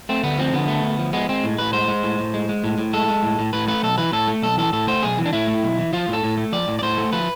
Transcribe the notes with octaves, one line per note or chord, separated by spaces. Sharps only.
A3 C4
D2 B3
F3 C4
D3 B3
A3
D2
F3
G#3 B3
G#3 C4
A2
A2 B4
G#3 C5
G#3
A2
A2
G#3
G#3
A2
A2
G#3 A4
G#3
A2
A2
A2 B4
A3 B4
B1 A4
E3 B4
A2 A4
A3
B1 A4
E3 A4
A2 A4
A3 C5
B1 G#4
E3
D4
A2 E4
A3
B1
E3
F3 F4
A2
A4
A2
A3
F3 D5
A2
D5
A2 C5
A3
F3 B4